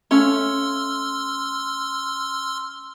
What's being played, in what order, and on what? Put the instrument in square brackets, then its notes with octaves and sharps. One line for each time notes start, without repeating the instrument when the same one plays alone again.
[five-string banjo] A3 C#4 F5 [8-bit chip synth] C6 E6 F6